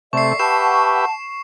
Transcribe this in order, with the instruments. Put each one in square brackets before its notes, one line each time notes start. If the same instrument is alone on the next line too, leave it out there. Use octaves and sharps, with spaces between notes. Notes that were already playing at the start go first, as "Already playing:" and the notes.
[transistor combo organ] C3 A3 [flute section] A4 D5 E5 [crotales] C#6 C7
[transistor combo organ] G4 B4 E5 [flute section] F#5 A5 C#6 [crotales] E7